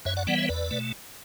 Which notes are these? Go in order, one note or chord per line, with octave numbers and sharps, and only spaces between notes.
F#2 C#5 E5
D5 F#5
E3 G3 B3 D5 F#5
C#5 E5
E2 B4 D5
B2 A3